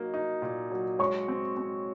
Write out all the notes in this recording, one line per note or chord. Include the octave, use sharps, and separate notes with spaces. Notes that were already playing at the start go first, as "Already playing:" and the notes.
Already playing: F#3 A#3 D#4 D#5
D#4
A#2
F#3
G#3 C#5 C#6
C4
C4